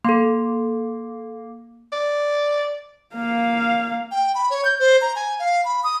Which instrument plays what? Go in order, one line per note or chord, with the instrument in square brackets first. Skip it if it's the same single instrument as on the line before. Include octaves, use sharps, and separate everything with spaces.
[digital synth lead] A#3 [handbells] A4 C6
[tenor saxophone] D5
[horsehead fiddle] A#3 F5
[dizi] G5
B5
C#5
G6
C5
A#5
G#5
F5
B5
D#6